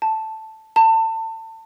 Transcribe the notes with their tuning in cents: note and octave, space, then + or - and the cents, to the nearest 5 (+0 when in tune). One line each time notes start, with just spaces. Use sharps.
A5 +0
A5 +30